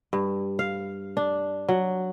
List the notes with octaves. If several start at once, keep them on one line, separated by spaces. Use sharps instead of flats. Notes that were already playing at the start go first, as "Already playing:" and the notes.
G2
F5
D4
F#3